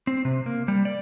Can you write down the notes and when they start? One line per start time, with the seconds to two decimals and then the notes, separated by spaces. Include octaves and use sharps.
0.07 C4
0.25 C3
0.46 A#3
0.68 G3
0.85 D5